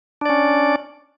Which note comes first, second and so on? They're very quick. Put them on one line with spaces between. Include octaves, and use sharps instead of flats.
D4 D5 C#4